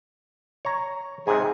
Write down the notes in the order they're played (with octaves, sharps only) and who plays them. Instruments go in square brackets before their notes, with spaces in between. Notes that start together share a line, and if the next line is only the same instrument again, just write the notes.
[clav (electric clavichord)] C#5 A#5
[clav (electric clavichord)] G#2 C3 [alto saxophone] G#4